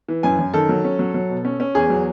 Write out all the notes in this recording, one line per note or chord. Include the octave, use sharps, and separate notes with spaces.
E3
F#2 G#5
F#2
D#3 A4
F#3
C#4
F#3
F#3
B2
C#4
C#4
E2 G#4
F#3